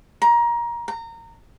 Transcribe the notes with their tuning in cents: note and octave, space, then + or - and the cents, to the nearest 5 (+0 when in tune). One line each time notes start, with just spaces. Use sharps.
A#5 +20
A#5 -25